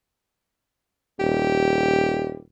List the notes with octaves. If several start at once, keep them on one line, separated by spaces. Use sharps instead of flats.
D#1 G4